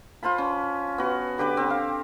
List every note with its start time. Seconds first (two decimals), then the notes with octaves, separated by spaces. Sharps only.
0.23 F4 C5 A5 B5
0.38 C#4
0.98 B3 F#4
1.38 D3 G4 B4 D6
1.57 C4
1.70 F5